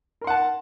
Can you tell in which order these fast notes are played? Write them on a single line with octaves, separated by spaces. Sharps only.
A#4 C6 F#5 A5